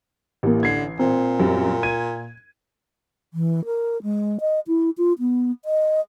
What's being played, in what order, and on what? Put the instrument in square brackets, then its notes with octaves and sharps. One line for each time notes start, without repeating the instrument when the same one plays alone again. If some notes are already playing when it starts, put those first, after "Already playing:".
[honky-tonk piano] A1 [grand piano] A#3 E4 G4
[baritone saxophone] D3 [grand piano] G#6 C7
[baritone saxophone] A#2 [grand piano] C4
[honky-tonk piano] F#2 G3
[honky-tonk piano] G#6 [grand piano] D#7
[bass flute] E3
A#4
G#3
D#5
E4
F4
B3
D#5